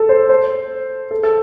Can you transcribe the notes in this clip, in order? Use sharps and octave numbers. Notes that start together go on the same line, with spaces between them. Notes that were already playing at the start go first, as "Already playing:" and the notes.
Already playing: A4
C5
C5
A4
A4